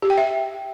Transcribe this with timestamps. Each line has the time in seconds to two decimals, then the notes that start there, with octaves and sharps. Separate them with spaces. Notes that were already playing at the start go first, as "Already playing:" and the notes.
0.02 G4
0.10 G5
0.18 E5